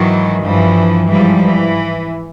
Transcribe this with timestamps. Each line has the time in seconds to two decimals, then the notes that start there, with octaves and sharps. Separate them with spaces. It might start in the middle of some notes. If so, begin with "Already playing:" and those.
Already playing: G#2 D#3 E3 F#3
0.42 G2 E3 F3
1.10 G#2 E3 F3 G3
1.44 E3